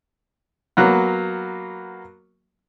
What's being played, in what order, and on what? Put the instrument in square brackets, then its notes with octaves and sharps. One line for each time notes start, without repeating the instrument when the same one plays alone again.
[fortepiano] F#3 A#3 B3